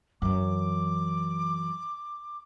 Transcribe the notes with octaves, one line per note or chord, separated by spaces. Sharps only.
F#2 E3 D6